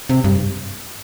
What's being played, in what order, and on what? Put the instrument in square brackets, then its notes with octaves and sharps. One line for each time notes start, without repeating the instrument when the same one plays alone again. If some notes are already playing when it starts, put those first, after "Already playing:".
[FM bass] C3
G2